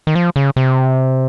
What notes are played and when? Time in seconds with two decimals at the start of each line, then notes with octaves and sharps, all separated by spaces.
0.07 D#3
0.15 F3
0.36 C#3
0.56 C3